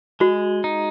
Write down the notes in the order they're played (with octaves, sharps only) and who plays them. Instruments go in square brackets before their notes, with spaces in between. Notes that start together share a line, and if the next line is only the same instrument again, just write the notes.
[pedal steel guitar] G#3 [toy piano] F#4
[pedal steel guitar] D#4